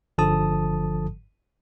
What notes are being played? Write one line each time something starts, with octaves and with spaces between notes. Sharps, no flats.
G1 D3 F3 A4 A5 D#6